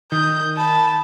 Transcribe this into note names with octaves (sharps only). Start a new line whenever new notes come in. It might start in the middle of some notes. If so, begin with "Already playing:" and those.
D#3 D#6 G6
A5 B5